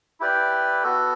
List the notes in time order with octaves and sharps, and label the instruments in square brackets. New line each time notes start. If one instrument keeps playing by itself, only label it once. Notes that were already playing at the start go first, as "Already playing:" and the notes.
[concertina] E4 G4 B4 D5 G5
B3 F#4 A4